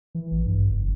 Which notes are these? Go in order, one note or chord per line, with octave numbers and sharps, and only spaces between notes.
E3
A1
G2
F#1